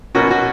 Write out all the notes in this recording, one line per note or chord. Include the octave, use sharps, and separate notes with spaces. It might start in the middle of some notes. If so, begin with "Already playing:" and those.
B2 A#3 C#4 F#4
F#4